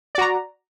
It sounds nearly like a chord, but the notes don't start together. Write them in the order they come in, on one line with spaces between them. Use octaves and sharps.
D5 F#4 A#5